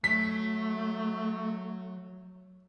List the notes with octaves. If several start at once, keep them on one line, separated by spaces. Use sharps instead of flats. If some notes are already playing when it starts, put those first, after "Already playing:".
F#3 A3 B6